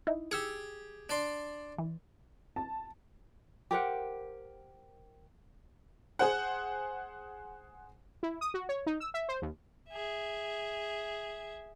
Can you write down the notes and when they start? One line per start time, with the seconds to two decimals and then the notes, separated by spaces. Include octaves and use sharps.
0.07 D#4 E4
0.31 G4 G#4 E6 C#7
1.09 D4 D5 C6
1.78 E3
2.56 A5
3.71 G4 A#4 C5 F#5
6.19 G#4 C5 F#5
8.23 E4
8.41 D#6
8.54 F#4
8.69 C#5
8.86 D#4
9.00 E6
9.14 E5
9.29 C5
9.42 D#2
9.89 G#4 E5